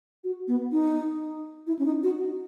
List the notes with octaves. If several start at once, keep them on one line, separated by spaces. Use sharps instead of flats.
F#4
B3
D#4
E4
C#4
D#4
F#4